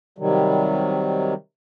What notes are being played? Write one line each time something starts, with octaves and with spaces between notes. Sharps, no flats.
C3 D#3 F#3 G3